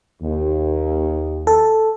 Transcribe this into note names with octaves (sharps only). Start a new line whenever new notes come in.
D#2
A4